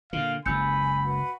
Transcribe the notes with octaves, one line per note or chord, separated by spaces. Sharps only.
A#2 D3 F5
F#1 C#2 F#2 G#5 B5 E6 G6 C#7
F#4 B4 F#5